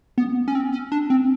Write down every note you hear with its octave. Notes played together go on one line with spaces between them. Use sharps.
B3
C#4
C4
C#4
D4
C4